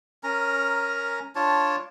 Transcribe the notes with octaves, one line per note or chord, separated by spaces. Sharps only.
C#4 A#4 A#5
D4 F4 C#5 A5